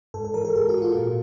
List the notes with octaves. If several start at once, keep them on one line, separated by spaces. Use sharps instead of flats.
G#2 A4
A4
E3 A#4
A4
G#2 G#4
F#4
E3
F4
A#2